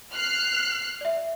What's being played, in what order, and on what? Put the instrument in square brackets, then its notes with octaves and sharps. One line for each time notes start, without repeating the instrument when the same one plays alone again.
[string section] F6 F#6 C7
[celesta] D5 E5